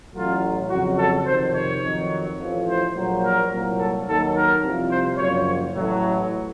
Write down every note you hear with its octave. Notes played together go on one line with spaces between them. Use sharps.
A1 A2 F#3 F4
F2 C#3 F#3 F#4
A4
F2 C3 D#3 C5
C#5
F2 D#3 F#3
A1 A2 F3
C5
A#1 A#2 F#3
A#4
C2 A#2 F#3
A4
D#2 D#3 F#3 A4
A#4
C2 C3 F3
C5
F#1 F#2 F3 C#5
A1 A2 F#3